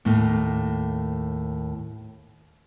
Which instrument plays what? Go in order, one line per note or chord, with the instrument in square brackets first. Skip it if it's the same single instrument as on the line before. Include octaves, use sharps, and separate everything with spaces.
[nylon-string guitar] D#2 A2 A#3